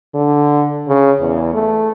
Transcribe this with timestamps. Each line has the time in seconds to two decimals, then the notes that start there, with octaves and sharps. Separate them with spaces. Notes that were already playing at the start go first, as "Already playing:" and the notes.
0.15 D3
0.88 C#3
1.20 E2
1.54 A3